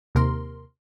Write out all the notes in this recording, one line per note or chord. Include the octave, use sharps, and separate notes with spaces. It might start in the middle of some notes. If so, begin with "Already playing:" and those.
D#2 C3 A#4 C6